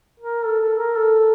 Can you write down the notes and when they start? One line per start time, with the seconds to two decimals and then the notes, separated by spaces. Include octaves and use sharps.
0.20 A#4
0.45 A4
0.61 A4
0.78 A#4
0.96 A4